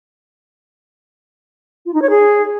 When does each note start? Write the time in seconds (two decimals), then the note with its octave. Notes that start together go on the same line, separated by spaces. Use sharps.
1.85 F4
1.93 D#4
2.02 C#5
2.10 G#4